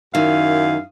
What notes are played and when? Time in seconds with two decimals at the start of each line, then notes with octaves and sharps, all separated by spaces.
0.15 F#2 D#3 E4 F5